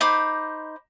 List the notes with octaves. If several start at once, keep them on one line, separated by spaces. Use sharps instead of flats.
D#4 C5 B5 D6